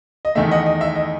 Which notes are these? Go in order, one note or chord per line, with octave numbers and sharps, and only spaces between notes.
D#5
E2 D#3 A3 E5
D#5 F#5
D#5
E5
D#5